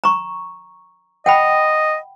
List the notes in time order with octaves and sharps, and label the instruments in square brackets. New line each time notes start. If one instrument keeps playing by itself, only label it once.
[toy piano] A#5 C#6
[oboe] D#5 [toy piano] F#5 G5 B5